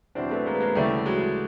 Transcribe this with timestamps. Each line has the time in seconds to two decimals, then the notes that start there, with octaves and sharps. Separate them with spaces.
0.15 E2 B2 F#3 C4 D4
0.31 A3 B3
0.46 G#3 A#3
0.54 B3
0.60 G#3 A#3
0.75 D2 C#3 E3 G3 A3
1.05 F#3 G#3